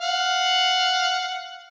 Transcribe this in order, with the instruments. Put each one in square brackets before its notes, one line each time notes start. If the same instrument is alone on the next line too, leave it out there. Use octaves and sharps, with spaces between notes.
[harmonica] F5 F#5